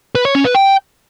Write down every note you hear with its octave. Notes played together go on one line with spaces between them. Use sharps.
B4
C#5
C#4
B4
G5